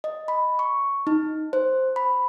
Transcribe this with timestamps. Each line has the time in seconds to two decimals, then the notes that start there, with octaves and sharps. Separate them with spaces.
0.04 D#5
0.28 B5
0.59 C#6
1.07 D#4
1.53 C5
1.96 B5